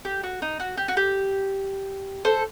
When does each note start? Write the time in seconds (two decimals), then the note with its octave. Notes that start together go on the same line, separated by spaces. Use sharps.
0.05 G4
0.23 F#4
0.42 D#4
0.60 F#4
0.77 G4
0.88 F#4
0.97 G4
2.25 A4 C5